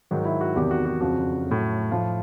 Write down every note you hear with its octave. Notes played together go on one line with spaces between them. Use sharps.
G#2 D#3 F#3
E4
F#4
E2 C3 D#3 G4
F#4
F#4
F2 C#3 F3 F#4
A2 F#3
A2 F3 F4